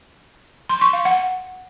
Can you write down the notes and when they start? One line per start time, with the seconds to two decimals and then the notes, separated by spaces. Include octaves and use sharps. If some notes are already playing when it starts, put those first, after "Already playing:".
0.69 C6
0.81 C#6
0.93 F5
1.05 F#5